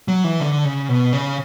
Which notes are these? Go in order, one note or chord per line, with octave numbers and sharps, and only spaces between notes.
F#3
E3
D3
C#3
B2
C#3